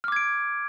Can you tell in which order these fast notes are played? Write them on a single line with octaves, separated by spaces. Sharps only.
F6 D6 G#6 D7